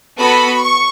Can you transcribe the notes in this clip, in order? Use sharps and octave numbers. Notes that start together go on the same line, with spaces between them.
B3 F#4 A4 B5
C#6